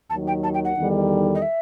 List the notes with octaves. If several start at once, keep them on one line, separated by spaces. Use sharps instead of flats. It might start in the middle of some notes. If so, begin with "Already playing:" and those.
D#2 D#3 F#3 A5
G5
A5
G5
F#5
E2 D#3 G3 D#4 A4
D#5
E5